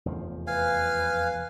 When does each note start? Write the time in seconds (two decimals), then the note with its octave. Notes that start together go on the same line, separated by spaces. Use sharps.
0.06 F1 E2 F3
0.47 B4 F5 G#5